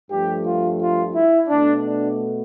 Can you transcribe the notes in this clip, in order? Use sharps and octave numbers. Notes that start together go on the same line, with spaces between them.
G2 F3 A3 G4
F4
F4
E4
B2 A3 D4
D4